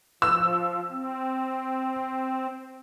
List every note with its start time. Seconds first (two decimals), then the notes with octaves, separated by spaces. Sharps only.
0.22 F3 E6
0.91 C4